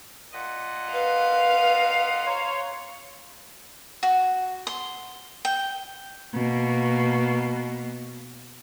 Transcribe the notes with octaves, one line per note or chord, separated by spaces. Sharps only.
A#2 D#5 F#5
B4 F5
C5 C#5 A#5
F#4
C6
G5
B2 A#3